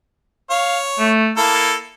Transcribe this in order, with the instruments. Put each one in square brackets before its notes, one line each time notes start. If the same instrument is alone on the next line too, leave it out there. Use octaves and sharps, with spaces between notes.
[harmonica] C#5 [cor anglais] F5
[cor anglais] A3
[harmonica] A#3 A4 [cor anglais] E4